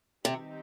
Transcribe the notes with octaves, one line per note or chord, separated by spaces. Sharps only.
C3 D#3 G3 C4 D#4 G4